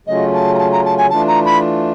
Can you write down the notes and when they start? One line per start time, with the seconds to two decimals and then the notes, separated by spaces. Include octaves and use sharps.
0.07 C#3 F#3 A3 C#4 F4 D#5
0.33 A5
0.55 A#5
0.58 A5
0.72 A#5
0.85 A5
0.97 G#5
1.10 E3 A3 D4 F4 A5
1.27 A#5
1.45 B5